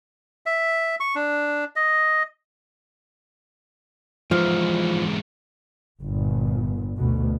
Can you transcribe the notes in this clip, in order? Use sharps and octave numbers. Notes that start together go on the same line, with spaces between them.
E5
C#6
D4
D#5
G#2 E3 F3
G1 A#2
D2 B2